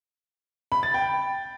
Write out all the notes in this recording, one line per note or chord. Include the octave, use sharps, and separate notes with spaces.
B5
A6
G5